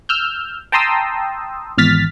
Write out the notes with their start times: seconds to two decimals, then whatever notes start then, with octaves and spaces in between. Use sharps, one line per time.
0.09 E6 F6 G6
0.72 G5 A5 A#5 C6 D#6 E6
1.78 G#1 E2 F6 A6 B6